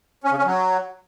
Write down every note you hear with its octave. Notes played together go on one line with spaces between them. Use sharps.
C#4
C#3
C#4
F#3